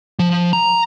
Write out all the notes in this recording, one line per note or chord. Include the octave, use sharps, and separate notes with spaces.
F3
A#5